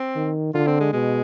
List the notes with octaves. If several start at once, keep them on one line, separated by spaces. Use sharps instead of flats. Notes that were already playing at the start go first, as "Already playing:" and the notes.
Already playing: C4
D#3
D3 F4
C4
G#3
B2 G#3